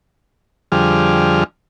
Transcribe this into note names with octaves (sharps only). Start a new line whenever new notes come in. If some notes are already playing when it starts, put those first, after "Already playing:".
F2 D3 F3 G3 G#4 F6